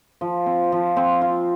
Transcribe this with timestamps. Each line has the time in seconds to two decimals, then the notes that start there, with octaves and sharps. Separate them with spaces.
0.21 F3
0.46 C4
0.72 F3
0.97 C4
1.21 F4